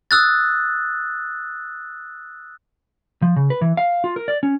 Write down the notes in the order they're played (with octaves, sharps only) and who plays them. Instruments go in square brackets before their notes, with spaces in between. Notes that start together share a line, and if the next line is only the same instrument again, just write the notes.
[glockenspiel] D#6 E6 F#6 A6
[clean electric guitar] F3
C#3
B4
E3
F5
F4
A#4
D5
C#4